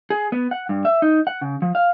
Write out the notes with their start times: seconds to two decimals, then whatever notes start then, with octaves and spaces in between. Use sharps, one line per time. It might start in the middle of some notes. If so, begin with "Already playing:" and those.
0.10 G#4
0.32 B3
0.51 F#5
0.69 G2
0.85 E5
1.02 D#4
1.27 F#5
1.41 C#3
1.62 F3
1.75 F5